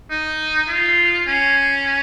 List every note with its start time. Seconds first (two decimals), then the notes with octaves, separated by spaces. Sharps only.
0.11 D#4
0.68 F4
1.27 C#4